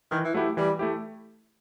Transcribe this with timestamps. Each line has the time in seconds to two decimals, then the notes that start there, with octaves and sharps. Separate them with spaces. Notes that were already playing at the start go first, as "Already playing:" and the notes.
0.11 D#3 E3
0.24 E3
0.34 F#3 A3 E4 G4
0.57 E3 G3
0.79 A3 E4 G4